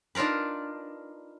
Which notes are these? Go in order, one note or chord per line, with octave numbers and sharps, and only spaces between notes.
D4 D#4 F4 A#4 B4